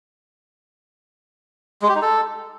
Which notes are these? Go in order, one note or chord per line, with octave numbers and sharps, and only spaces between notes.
G#3
G4
D#4
A4